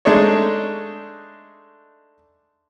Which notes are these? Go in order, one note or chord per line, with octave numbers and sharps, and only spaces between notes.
G#3 A3 D4 D#4 C#5